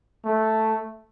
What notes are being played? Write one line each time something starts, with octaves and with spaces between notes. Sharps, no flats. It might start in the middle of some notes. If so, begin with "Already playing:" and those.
A3